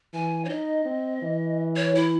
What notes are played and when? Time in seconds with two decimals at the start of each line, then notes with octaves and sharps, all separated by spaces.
0.14 E3 G#5
0.45 C#5
0.49 D#4 D#5
0.85 C4
1.22 E3
1.76 C#5
1.95 E4